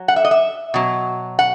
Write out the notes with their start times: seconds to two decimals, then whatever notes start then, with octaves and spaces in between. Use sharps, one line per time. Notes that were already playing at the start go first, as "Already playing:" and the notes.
Already playing: F#3
0.08 F#5
0.16 E5
0.25 D#5
0.31 E5
0.74 B2 F#3
1.39 F#5